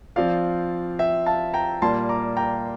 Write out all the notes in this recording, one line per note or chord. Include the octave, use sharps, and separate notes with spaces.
F3 C4 F4 D5 F5
E5 G5
F5 A5
G5 A#5
A#2 G3 A#3 F4 A5 C6
A#5 D6
G5 A#5